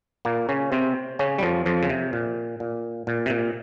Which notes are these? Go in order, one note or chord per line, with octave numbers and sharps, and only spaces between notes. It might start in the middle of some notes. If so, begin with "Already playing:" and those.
A#2 A#3
C#3 C#4
C3 C4
C#3 C#4
G3
F2 F3
F2 F3
C#3
C3
A#2
A#2
A#2
C3
A#2